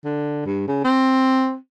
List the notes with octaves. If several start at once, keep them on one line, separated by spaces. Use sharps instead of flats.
D3
G2
C#3
C4